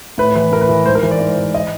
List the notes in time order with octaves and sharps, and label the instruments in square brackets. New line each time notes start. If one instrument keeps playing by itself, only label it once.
[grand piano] A2 B4
E3 B4
A2 A#4
B4
E3
G#2 C5
A#4
E3
D5
G#2
E3
D#5